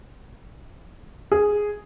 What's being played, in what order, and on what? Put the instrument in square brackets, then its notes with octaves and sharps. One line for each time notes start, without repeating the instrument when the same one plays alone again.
[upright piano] G#4